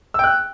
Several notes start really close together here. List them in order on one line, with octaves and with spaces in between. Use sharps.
E6 G5 F#6